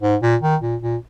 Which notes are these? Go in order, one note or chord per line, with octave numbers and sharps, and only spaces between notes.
G#2
A#2
D#3
A#2
A#2